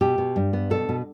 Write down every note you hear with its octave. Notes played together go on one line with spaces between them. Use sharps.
B2 G4
B2
G2
B3
B2 A4
B2